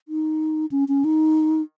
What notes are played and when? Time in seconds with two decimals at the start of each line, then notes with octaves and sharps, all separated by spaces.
0.08 D#4
0.71 C#4
0.88 C#4
1.04 D#4